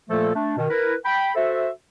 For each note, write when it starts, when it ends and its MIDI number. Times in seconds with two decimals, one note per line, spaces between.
0.10 0.31 46
0.10 0.31 53
0.10 0.31 57
0.10 0.31 58
0.10 0.31 69
0.35 0.57 57
0.35 0.57 62
0.57 0.68 47
0.57 0.68 51
0.70 0.95 64
0.70 0.95 70
0.70 0.95 71
1.05 1.31 79
1.05 1.31 83
1.35 1.70 66
1.35 1.70 69
1.35 1.70 72
1.35 1.70 76